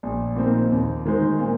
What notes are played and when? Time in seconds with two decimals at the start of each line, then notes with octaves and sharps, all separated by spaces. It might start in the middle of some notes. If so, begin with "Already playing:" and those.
0.03 A#1
0.36 A#2 F3 C4 D#4
0.70 D#2
1.05 D#3 G#3 D#4 C5
1.39 A#2